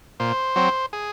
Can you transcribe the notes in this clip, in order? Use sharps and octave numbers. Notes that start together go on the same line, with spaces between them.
A#2 C5
F#3 C4
G#4